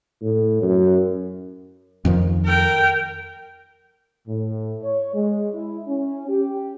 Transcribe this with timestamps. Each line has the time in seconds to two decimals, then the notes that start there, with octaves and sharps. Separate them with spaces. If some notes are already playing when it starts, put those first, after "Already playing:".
0.22 A2
0.62 F#2
2.05 F2 D#3 F3
2.45 A#4 G5
4.28 A2
4.83 C#5
5.14 G#3
5.54 E4
5.88 C#4
6.29 G4